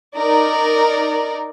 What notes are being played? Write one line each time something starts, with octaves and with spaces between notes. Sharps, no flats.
D#4 A#4 D5